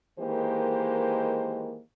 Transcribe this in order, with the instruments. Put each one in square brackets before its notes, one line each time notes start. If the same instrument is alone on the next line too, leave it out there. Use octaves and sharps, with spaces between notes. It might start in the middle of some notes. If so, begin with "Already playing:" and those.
[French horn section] D#3 E3 G#3 A#3 G4 C5